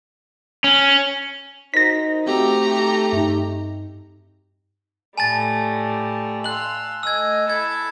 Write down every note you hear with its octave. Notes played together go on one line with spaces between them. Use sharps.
C#4
D#4 F#4 A#4 C5 A#6 B6
A3 C4 D#4 F#4 G4 A#5
G2 D#4
A2 G3 A3 G#5 A5 A6
F5 C6 E6 F#6 F#7
A3 D#5 G#5 E6 G#6
E4 A4 B5 G#6